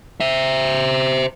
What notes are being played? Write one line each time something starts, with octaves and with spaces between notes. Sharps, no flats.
C5 E5